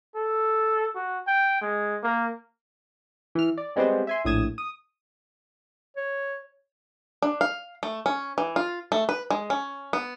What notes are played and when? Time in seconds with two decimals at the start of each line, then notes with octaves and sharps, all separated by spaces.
0.15 A4
0.95 F#4
1.27 G5
1.61 G#3
2.03 A#3
3.35 E3 F6
3.57 D5
3.76 G3 G#3 B3 C4 G4 C5
4.07 E5 G#5 C6
4.25 A#1 A2 D#6 G#6 E7
4.58 D#6
5.97 C#5
7.22 D4
7.41 F5
7.83 A3
8.06 C#4
8.38 E3
8.56 F4
8.92 A3
9.09 B4
9.30 G#3
9.50 C#4
9.93 B3